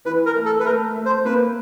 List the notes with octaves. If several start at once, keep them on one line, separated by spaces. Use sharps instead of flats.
E3 B4
A#4
A3
A4
B4
A3 A#4
A3
C5
A#3 B4